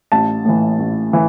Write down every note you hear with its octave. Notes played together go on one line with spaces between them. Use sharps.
A1 A5
A2 E3
A1
A2 E3